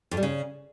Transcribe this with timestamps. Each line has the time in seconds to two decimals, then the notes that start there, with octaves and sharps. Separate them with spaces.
0.11 F2
0.17 G3
0.23 C#3